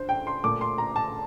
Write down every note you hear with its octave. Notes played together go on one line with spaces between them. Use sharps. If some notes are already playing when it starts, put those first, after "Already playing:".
Already playing: D3 C5
G5
C6
A#2 A3 D6
C6
A#5
A5